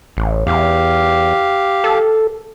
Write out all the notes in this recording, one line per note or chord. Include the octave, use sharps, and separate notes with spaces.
A1
E2 G4 F5
A4